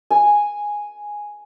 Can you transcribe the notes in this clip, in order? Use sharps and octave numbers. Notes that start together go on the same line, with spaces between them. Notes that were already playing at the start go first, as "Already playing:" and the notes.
G#5